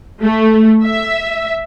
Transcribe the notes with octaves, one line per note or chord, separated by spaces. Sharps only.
A3
E5